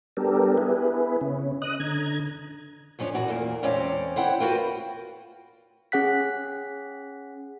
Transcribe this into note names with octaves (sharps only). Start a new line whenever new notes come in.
G3 B3 D4 G4 A4 A#4
B3 E4 G#4 B4
C#3 C#4
D#5 D#6 F#6
D3 A#5 G#6
F#2 F3 C#4 D4 C#5
A#2 E3 F#4 D5
E2 A#2 A#3
E2 G#3 C4 C#4 D5 F5
C4 E4 F#5 G5
F4 F#4 A#4 B4 F5 G5
C#4 G#4 F#5 F#6 B6